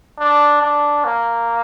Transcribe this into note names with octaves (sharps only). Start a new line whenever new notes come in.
D4
D4
A#3